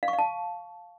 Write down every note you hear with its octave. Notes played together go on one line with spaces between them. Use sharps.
F5
C#6
F5
A5